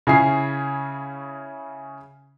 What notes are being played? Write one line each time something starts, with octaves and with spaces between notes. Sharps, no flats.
C#3 C#4 E4 G#4 C7